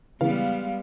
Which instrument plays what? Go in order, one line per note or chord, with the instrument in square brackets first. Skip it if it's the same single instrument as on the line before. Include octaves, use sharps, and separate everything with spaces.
[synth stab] C#3 E3 [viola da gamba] G3 G#3 B3 [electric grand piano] F5